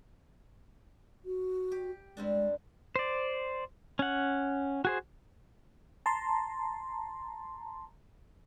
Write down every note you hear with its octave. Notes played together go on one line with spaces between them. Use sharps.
F#4
G4
G2 G#3 C4 D4
C5 D5
C#4 F#5
F#4 G#4 C5
A5 A#5 C6